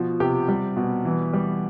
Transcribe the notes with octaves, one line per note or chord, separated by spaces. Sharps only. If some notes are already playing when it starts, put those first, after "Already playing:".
Already playing: B2 F3
C3 G4
G3
B2
E3
G3